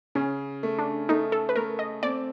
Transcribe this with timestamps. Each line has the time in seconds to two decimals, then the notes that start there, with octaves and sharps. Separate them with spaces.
0.15 C#3 C#4
0.63 A3
0.79 D4
1.09 A3 D#4
1.32 A4
1.49 B4
1.56 A3 A#4
1.79 D#5
2.03 C4 D5